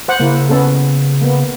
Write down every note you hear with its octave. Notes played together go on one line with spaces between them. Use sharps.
C5 F#5
C#3 A#3 E4
B3 C#4 A4
A#3 B3